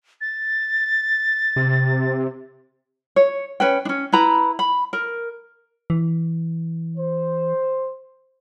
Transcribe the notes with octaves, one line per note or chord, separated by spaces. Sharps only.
A6
C3
C#5
C#4 B4 G5
C#4 D4
E4 B4 A#5 B5
B5
A#4
E3
C5